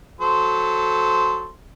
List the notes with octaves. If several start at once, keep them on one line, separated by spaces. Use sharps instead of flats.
F#3 A4 C5